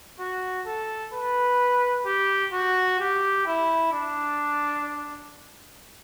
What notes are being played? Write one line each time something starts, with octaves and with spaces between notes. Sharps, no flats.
F#4
A4
B4
G4
F#4
G4
E4
D4